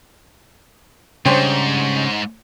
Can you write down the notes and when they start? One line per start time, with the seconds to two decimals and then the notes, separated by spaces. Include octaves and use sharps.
1.26 F2 G#2 C#3 G3 D4 C5 C#5 G5